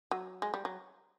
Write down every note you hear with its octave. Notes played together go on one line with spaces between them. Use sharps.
F#3
G#3
G3
F#3